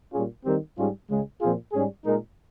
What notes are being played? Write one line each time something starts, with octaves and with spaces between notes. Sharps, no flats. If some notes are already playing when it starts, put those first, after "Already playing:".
A#2 G3 C#4 F4 G#4
D#3 G3 C4 G4 A#4
G#2 G3 C#4 F4 G#4
C#2 C#3 G#3
A#2 F3 C4 F4 G#4
G#2 G3 C#4 G#4
A#2 G#3 D#4 A#4